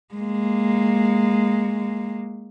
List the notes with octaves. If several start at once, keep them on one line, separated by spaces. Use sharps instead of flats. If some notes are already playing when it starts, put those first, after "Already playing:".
G#3 A#3